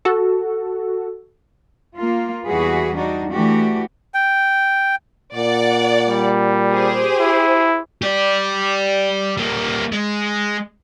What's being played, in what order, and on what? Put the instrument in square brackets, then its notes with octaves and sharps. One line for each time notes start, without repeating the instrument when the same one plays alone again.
[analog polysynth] F#4 A4
[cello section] A#3 F4
E2 E3 G3 F#4 G#4 B4
G3 D4 D#4 F#4
E3 A3 D4 F#4 G4
[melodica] G5
[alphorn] A#2 [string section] D5 F#5
[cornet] G3
[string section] G4 G#4 C5
[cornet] E4
[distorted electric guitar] G4 D5
G3 A#3
G#3